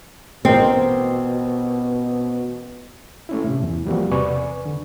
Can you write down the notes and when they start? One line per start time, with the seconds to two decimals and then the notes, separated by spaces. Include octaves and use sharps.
0.45 A1 B2 C4 A#4 C5
3.29 A3 C#4 E4
3.44 A2 C3
3.63 E2 E3
3.86 F3 G3 A#3 C4 F#4
4.12 E2 C3 B4 D5 G#5 C#6
4.66 D3